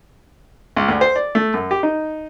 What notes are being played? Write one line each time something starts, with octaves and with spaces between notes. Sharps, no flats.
C#2
D2
C5
D5
A3
F#2
G4
D#4